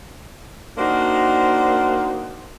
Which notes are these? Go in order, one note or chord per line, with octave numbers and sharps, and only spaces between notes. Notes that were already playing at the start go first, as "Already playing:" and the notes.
A#3 D4 D#4 F#4 C5